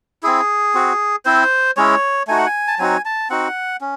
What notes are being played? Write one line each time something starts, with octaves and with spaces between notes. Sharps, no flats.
C4 E4 G#4
C4 F#4
C4 E4 C5
G#3 C#4 E4 C#5
A3 D#4 F#4 G#5
F#5
G#5
A5
F#3 C4 D#4 F#4 G#5
A5
C4 D#4 F#4 F#5
C#4